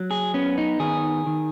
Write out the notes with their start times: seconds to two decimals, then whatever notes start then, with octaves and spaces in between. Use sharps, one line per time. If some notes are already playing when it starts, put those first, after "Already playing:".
Already playing: F#3
0.11 G#4
0.34 B3 C#4
0.58 D#4
0.79 D#3 G#4
1.26 D#3